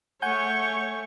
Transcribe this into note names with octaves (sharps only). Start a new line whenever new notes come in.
A3 C#5 F#5 G#5 C#6 G6